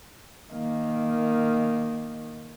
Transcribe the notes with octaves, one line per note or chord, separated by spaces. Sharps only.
D#3 A#3